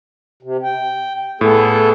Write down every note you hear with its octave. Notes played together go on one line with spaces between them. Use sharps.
C3
G5
A2 B3 G#4 A4